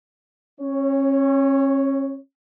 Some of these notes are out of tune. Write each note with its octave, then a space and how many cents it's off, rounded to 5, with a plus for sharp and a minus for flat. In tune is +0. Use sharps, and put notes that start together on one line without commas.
C#4 -35 C#5 +0